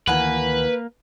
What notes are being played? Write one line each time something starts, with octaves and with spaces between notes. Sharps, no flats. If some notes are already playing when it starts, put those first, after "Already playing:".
D2 D#3 E3 A#3 B4 F#5 G#5